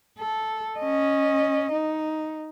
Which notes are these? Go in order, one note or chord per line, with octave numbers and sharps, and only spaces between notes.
A4
C#4 D#5
D#4